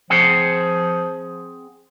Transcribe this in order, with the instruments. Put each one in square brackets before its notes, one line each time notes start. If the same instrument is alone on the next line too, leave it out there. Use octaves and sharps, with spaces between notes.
[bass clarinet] F3 [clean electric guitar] C4 G#4 F#5